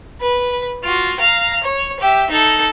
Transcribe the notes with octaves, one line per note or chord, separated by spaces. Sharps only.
B4
F4 F#4
F5 A#5
C#5
G4 E5
D#4 A4